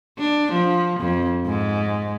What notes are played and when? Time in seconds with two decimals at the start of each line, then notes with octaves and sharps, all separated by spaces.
0.19 D4
0.52 F3
1.00 F2
1.46 G#2